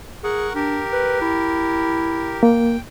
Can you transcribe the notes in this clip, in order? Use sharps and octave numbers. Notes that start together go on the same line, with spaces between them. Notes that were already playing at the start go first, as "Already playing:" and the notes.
G#4 A#4 F#5 C#6
D4 G4 A#4
B4
E4
A#3 G5